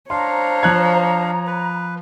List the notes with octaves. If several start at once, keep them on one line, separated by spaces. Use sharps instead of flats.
D4 C5 C#5 F5 A#5 C6
F3 F#6 G#6
B4